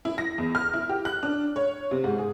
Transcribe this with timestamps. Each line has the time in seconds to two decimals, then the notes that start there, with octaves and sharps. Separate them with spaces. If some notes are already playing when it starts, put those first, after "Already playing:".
0.05 E4
0.18 A#6
0.38 E2
0.55 F6
0.74 E4
0.89 G4
1.05 F#6
1.23 D4
1.56 C#5
1.91 C3
2.04 G#2
2.18 G#4